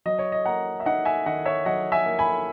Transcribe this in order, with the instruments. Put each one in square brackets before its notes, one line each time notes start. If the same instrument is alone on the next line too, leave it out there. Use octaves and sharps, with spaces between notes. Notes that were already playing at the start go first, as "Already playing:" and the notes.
[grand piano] F#3 D#5
C#5
D#5
A#3 F#5 A#5
E5
D#4 D#5 F#5
E5 G#5
D#3 D#5 F#5
C#5 E5
F#3 D#5 F#5
E5 G#5
A#3
G#5 B5